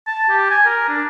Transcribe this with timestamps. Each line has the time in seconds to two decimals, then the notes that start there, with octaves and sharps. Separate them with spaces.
0.07 A5
0.29 G4
0.50 G#5
0.65 A#4
0.89 D4